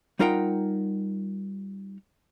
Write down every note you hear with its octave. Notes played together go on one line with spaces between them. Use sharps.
G3 D#4 F4 A#4 F#5 G5